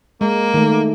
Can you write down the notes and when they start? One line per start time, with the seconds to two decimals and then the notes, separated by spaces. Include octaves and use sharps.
0.21 G#3 A#3
0.54 D#3 A3